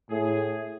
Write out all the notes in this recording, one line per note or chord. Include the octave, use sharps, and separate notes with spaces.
A2 G#4